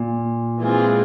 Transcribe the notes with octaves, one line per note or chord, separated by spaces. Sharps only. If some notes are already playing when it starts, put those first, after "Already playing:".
Already playing: A#2
E3 G#3 C4 F4 G#4